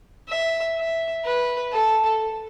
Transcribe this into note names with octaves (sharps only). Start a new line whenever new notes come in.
E5
E5
B4
A4